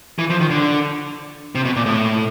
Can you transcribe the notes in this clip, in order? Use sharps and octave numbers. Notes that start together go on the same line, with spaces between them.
E3
F3
D#3
D3
C3
B2
A#2
A2